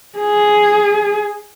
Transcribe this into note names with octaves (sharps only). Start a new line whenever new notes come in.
G#4